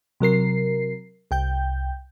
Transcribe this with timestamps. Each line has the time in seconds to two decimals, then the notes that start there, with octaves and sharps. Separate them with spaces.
0.20 C3 F#3 A#4 C7
1.31 C2 G5 G6